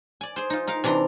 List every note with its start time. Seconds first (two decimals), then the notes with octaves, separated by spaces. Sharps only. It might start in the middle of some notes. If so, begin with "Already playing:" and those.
0.21 D5 G#5
0.36 G#4 C5
0.50 D#4 F4
0.67 D#4 A#4 F5
0.84 C3 E3 D4 A#5 C6